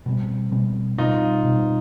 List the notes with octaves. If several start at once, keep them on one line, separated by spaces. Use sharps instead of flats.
B2 G3 C4
B2 G3 C4
B2 G3 C4 D#4 F4
B2 G3 C4